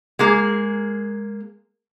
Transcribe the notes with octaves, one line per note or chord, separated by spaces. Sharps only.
G#3 A#3 G#4